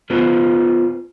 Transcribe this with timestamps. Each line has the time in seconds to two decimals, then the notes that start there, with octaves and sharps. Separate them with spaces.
0.10 B3 F4 B4 C5